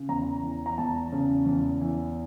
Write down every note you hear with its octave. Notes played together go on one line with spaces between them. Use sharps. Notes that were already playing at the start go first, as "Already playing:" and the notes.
Already playing: C#3
E2 A#5
E3
A#5
E2 A5
C#3
E2
E3